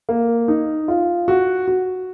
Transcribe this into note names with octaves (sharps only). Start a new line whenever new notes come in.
A#3
D#4
F4
F#4
F#4